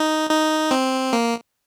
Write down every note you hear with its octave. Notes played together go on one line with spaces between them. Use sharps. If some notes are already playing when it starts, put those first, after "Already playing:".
Already playing: D#4
D#4
C4
A#3